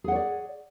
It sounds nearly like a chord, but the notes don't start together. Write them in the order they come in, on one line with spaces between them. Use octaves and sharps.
G#4 F#5 C#5 D5